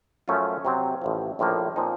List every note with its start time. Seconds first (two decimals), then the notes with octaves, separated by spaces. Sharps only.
0.28 F#2 F3 A3 C#4 F4
0.65 C3 F#3 C4
1.02 A1 A2 F3
1.39 A#1 A2 F3 A#3
1.76 A#2 F3 C4 D#4